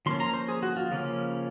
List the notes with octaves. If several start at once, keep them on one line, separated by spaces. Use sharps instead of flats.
F3 A#3 C#4 C6
A#5
C5
G#4
F#4
F4
C#3 F3 A#3 C#4